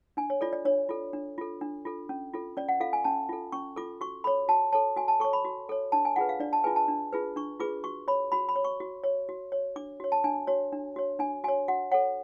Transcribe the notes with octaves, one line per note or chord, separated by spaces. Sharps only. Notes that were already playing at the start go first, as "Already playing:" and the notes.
D4 G#5
C#5
F4 A4 D5
D5
D4 C#5
F4 A4
D4
F4 A4
D4
F4 A4
C#4
F4 A4
C#4 D5
F#5
F4 A4 F5
G#5
C#4 A5
F4 A4
C#4 C#6
F4 A4 D6
F#4 C#6
A4 C#5 B5
F#4 A5
A4 C#5 A5
F#4 G#5
A5
A4 C#5 C#6
B5
F#4
A4 C#5
D4 A5
G#5
F4 G#4 B4 F#5
F5
D4 D5
A5
F4 G#4 B4 G#5
A5
D4
F4 G#4 B4
D4 C#6
F4 G#4 B4 D6
F#4 C#6
C#5 B5
F#4 B5
B5
C#5
C#6
F#4
C#5
F#4
C#5
D4 D6
F#4 C#5
A5
D4 G#5
F#4 C#5
D4
F#4 C#5
D4 G#5
F#4 C#5 G#5
F#4 F#5
A4 C#5 F#5